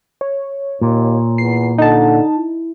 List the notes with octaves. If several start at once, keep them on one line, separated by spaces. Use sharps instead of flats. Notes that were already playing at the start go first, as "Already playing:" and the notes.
C#5
D#2 A#2
E2 C7
D3 D#4 A5
E4